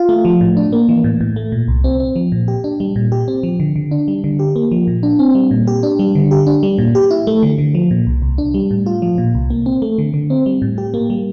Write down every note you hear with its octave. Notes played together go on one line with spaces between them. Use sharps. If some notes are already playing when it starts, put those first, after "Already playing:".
Already playing: F4
A3
F3
A2
D4
A#3
E3
A2
A2
A3
A#2
C2
C4
C4
F3
A#2
G4
D4
G3
A#2
G4
C4
F3
D3
D3
D4
G3
D3
G4
A#3
F3
A#2
D4
C4
G3
A#2
G4
D4
G3
D3
G4
D4
G3
A#2
G4
E4
A3
D3
D3
F3
A#2
C2
C2
D4
G3
A2
F4
F3
A#2
C2
A#3
C4
A3
D3
D3
C4
G3
A2
G4
A#3
G3